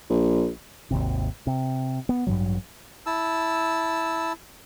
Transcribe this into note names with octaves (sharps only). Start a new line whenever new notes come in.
A#1
G#1 D#2 C3
C3
B3
A1 G2 B2 F#3
E4 A5 E6